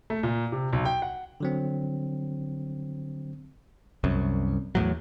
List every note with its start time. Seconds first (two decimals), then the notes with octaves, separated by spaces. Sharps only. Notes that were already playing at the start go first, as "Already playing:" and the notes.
0.10 A3
0.23 A#2
0.52 C3
0.73 B1
0.85 G5
1.02 F#5
1.40 D3 F#3 C4
4.04 C2 F#2
4.75 E2 A2 F#3